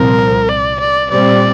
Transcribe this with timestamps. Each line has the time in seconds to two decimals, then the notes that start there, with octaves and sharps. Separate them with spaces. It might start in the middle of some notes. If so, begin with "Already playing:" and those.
Already playing: C2 A#2 F3 C4 A#4
0.48 D5
0.80 D5
1.11 A#2 G3 C4 D5